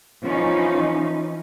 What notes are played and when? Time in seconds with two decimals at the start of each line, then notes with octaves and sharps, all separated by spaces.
0.24 E3 F3 C#4 D#4